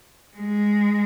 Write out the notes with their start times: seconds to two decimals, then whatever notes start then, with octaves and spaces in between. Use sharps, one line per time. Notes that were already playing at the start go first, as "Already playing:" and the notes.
0.37 G#3